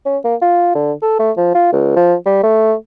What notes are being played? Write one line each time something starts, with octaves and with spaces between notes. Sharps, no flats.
C#4
A#3
F4
D3
A4
A3
F3
F4
C#2
F3
G3
A3